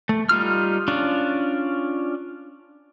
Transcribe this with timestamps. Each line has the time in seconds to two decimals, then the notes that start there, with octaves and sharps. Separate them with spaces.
0.09 A3
0.29 G3 D#4 F4 F6
0.88 C#4 D4 F4